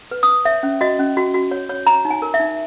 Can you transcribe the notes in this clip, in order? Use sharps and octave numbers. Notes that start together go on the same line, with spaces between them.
B4
D#6
B4
C#5 E5
C#4
F#4 D#5
C#4
F#4
F#4
C#5
C#5
C#5 A#5
D#4
G#5
A#4
E5
D#4